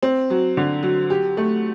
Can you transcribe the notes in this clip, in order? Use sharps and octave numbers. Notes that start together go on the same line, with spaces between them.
C4
F#3
D3
F#3
G4
A3